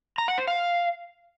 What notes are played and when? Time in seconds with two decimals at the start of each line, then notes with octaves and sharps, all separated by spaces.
0.18 A#5
0.28 F#5
0.38 C5
0.48 F5